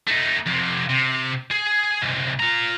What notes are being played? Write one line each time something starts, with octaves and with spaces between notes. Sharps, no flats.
A3 D#4
F2 C3
C3
G#4
C2 G#2
F4 A#5